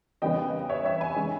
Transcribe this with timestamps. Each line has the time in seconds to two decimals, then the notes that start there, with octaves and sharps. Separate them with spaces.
0.22 E2 C#3 E3 G3 B3 D#5 G5
0.69 C#5 E5
0.85 C#5 E5
1.00 G#5 B5
1.16 E3 G#3 C#4